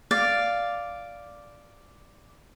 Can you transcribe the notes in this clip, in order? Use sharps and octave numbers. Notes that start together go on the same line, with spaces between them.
D5 F5